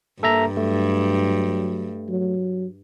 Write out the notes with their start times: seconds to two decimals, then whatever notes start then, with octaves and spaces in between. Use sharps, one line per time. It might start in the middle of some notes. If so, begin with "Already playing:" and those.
0.23 G2 A#3 A4 E5 A#5
0.57 F#3 A3
2.09 F#3